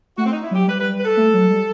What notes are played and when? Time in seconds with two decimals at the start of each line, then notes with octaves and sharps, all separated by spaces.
0.17 A3 F#4
0.25 C4
0.30 D#4
0.42 E4
0.51 F#3 G4
0.67 G3 B4
0.79 B4
0.99 B4
1.05 A4
1.17 A3
1.34 F#3
1.50 G3